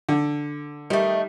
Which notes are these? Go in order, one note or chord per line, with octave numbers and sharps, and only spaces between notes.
D3
D#3 G3 A3